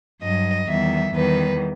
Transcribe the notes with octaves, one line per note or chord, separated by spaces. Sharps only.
G2 F#3 D#5
E2 D#3 G3 E5
E2 D#3 G3 B4